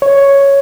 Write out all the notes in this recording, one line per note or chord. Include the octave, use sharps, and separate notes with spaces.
C#5